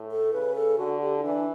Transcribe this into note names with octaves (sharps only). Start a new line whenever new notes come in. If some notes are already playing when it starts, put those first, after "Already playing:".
Already playing: A2
A4
C#3 B4
A4
D3 F#4
G4
E4
E3 D4